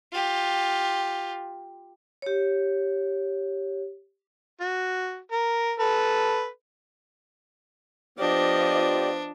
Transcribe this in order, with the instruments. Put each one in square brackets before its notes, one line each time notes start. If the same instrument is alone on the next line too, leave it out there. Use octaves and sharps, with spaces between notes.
[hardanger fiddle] F4 G4
[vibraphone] G4 C#5
[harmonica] F#4
A#4
A4 B4
[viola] F3 D#5 [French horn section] B3 F4 C5 [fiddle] D4 [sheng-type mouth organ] G4 D5